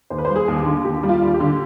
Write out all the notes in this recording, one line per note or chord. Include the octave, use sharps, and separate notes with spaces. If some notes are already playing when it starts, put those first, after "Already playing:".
D#2 C5
B4
C5
G3
G#4
D#2
G4
D3
D#2 G4
G3
F4
D#2
G4
D3